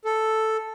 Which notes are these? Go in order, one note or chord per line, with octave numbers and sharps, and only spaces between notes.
A4